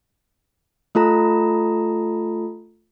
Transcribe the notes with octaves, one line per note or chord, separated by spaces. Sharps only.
A3 F4 A4 A#5